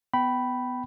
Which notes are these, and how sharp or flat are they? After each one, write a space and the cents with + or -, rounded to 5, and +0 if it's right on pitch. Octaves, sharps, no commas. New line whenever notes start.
B3 +15 G5 -25 B5 +0